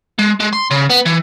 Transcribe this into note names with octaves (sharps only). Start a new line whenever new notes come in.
G#3
G#3
C6
C#3
B3
E3